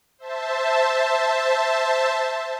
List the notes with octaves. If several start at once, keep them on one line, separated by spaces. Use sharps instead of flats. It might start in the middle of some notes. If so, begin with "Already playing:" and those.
C5 E5 A5